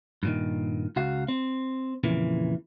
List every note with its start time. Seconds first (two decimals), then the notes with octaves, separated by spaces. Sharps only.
0.23 G2 A#2 D#3
0.96 C#2 F#4 F5
1.28 C4
2.04 F2 A#2 C#3 E3